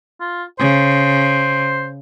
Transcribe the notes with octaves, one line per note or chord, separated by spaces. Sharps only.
F4
C#3 C5